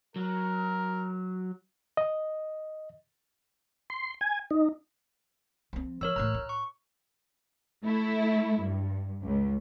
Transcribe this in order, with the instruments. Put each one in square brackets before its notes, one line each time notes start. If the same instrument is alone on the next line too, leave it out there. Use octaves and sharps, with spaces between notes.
[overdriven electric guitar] F#3 [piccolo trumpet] A#4
[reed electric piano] D#5
[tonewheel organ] C6
G#5
D#4
[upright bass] F3 C4
[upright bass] F3 [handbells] A#4 C#5 E6
[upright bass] A2 E3 [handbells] A#5 F#6
[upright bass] E4
[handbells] C#6
[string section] A3 E4
G2
C#2